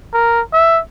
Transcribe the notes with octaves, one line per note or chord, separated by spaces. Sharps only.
A#4
E5